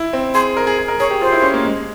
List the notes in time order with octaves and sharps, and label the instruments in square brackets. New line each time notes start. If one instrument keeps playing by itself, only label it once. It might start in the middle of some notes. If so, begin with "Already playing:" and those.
Already playing: [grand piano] E4
C4
[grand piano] G#4 [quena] C6
[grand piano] A#4
G#4
G#4
A#4
[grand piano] G#4 [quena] C#5
[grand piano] G4
[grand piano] F4 [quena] C5
[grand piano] E4
C#4
A#3
G#3